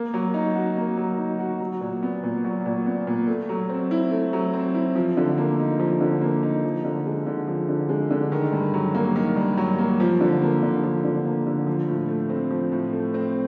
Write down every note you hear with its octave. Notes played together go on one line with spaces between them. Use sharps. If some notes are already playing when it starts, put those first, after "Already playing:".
Already playing: A#3
F#3
D#4
F#4
A#3
F#3
D#4
F#4
F#3
A#2
B3
A#2
F#3
A#2
B3
A#2
A3
F#3
C4
E4
A3
F#3
C4
E4
F3
D3
A#3
D#4
F3
D3
A#3
D#4
F3
D3
G#3
D3
F3
D3
G#3
D3
D#3
G2
F#3
A#3
D#3
G2
F#3
A#3
F3
D3
A#3
D3
F3
D3
A#3
D3
F3
A2
A3
C4
F3
A2
A3
C4